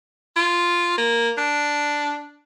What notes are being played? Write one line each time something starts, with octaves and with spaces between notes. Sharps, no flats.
F4
A#3
D4